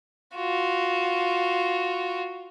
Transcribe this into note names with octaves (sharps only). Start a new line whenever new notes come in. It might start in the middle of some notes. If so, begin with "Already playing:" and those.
F4 F#4